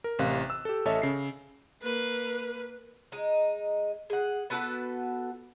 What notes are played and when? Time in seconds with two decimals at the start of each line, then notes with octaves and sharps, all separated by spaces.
0.04 A#4
0.19 A1 C3 F5 F#6
0.50 E6
0.65 G4 A4
0.86 A1 A4 C#5 D#5 E5 A5
1.02 C#3 C7
1.82 A#3 B4
3.12 G#3 D#4
4.10 G#4 F#5
4.50 B3 F#4 A4 B4